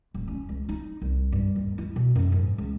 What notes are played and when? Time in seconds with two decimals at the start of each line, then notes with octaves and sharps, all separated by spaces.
0.14 D#1
0.28 C#4
0.49 C#2
0.69 D#4
1.02 C2
1.32 G2
1.56 D#2
1.78 E4
1.96 B2
2.15 F#2
2.32 G#2
2.58 C#2